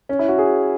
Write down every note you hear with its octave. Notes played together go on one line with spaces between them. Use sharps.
C#4
E4
F#4
G#4